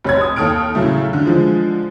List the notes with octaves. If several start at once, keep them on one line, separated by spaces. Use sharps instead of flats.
F1 C#5 G#6
D#6
D#2 A4 D#6 F6 D7
A2 C#3 F#3 A3
D3
D3 F3 G#3